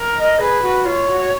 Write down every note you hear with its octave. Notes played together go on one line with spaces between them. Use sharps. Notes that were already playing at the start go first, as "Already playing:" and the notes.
Already playing: A#4
D#5
G#4 B4
F#4
F4 C#5
F#4